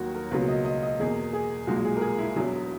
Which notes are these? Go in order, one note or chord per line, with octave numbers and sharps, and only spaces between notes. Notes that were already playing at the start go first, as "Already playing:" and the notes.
Already playing: D#2 D#3 F#3 A#3 F#4
A#4
C#2 B2 F#3 A#3 B4
D#5
D#5
D#5
E2 B2 A#3 G#4
G#4
B1 A#2 G#3 F#4
G#4
A#4
G#4
E4
E1 E2 B2 F#3